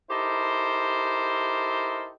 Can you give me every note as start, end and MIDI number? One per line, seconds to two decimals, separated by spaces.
0.10 2.11 63
0.10 2.11 64
0.10 2.11 67
0.10 2.11 69
0.10 2.11 70
0.10 2.11 72